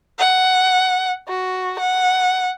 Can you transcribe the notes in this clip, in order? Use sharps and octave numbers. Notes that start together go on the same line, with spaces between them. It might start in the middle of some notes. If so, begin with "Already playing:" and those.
F#5
F#4
F#5